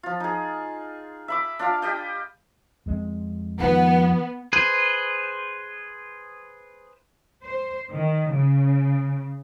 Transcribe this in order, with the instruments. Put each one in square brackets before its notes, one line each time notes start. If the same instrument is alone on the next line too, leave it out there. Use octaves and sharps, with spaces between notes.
[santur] F3 F4
D#4 G#4
E5 B5 D6
D4 F4 F5
G4 D#5 G5
[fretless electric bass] F2 G#3 C4
[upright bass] D#3 F3 [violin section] B3 [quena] F#5
[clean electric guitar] G#4 [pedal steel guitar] B4 C5
[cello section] C5
D#3
C#3